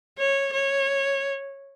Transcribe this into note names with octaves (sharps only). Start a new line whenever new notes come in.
C#5
C#5